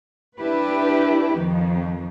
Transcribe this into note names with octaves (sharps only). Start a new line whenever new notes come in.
D4 E4 G4 B4
F2 D#3